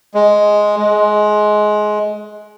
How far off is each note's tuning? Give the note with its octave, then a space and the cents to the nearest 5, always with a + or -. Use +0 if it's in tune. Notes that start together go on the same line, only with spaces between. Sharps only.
G#3 +5
G#3 +20